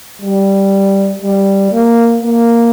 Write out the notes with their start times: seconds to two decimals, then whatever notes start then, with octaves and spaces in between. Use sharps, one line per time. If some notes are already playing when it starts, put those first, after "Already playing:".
0.22 G3
1.22 G3
1.72 A#3
2.23 A#3